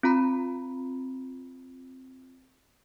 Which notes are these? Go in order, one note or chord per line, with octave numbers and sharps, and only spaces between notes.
C4 F4 A#5 B5